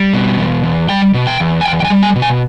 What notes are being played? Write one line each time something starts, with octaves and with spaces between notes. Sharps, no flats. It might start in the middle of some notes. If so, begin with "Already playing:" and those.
Already playing: G3
B2
E2
E2
G3 G5
B2
G5
E2
G#5
E2 G5
G5
G#5
G3
G#5
B2
G#5